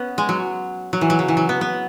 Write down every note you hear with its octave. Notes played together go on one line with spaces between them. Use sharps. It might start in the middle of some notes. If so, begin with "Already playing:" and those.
Already playing: B3 C#4
G#3
F#3
F#3
E3
F#3
C#3
E3
F#3
B3
B3